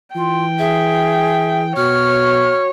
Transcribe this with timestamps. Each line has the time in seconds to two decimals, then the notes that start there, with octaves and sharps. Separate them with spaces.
0.15 E3 F4 G5
0.59 G#4 E5
1.76 B2 F#4 C#5 F6